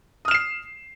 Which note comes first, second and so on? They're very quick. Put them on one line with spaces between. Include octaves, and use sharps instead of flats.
D#6 F6 E7 C7